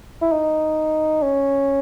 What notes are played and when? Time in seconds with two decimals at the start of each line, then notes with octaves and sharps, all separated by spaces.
0.22 E4
0.32 D#4
1.22 C#4